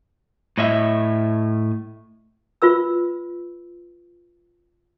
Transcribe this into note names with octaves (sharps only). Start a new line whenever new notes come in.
A2 D#5 E5
F4 B4 E6